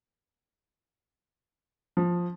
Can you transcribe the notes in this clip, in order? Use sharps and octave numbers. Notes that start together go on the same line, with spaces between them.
F3